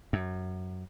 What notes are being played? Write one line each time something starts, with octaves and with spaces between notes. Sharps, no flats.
F#2